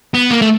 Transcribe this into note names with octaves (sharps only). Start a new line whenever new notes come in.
B3
A#3
A3